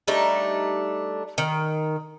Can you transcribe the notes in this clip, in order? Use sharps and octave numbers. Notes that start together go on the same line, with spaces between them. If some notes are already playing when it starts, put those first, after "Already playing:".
G3 A3 D4 D#4
D#3